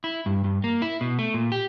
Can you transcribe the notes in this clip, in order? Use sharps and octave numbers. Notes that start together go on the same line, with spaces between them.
E4
G2
G2
A#3
E4
B2
A3
A#2
G4